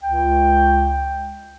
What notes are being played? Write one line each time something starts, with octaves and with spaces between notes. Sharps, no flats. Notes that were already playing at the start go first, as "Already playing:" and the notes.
C#2 G5